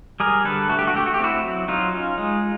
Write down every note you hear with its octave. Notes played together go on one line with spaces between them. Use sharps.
G3 G#4 A#4
D3 A4 B4
A3 F#4
G4
F#4
A3 G4
F#4
G4
C4 E4 F#4
F#3
F#3 D#4 F4
C#4
G#3